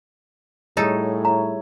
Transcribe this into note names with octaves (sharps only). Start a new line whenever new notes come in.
A2 G3 D#4 G#4 A4 C#5
E4 C#5 A#5